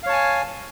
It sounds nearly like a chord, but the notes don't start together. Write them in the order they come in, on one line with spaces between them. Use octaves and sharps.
F5 C#5 A5 G#5